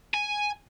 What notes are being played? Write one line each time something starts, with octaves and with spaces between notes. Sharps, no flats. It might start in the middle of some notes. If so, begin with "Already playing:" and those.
G#5